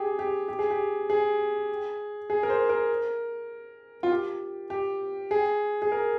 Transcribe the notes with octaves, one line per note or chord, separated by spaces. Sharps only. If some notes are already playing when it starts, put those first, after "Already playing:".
Already playing: G4 G#4
G4
G4
G#4
G4
G#4
G#4
A#4
C5
A#4
F4
G4
G4
G#4
G#4
A#4